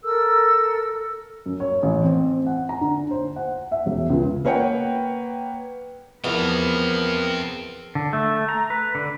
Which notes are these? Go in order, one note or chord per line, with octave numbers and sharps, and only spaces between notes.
A4 A#4 E6
F#2
C#5
A1
C4
F#5
A#5
D3
C5
F#5
E5
E1
C#2
A#3 B4 C#5 F#5 G5
E2 F3 B3 C4 A#4 F5
D3
A3
A#5
B4
D3